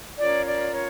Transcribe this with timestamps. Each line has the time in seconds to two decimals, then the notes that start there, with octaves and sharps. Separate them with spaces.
0.18 C#4 F4 A#4 C#5 D5
0.46 D5
0.72 C#5